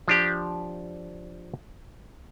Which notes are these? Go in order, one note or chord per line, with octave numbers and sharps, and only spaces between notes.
F3 D4 G4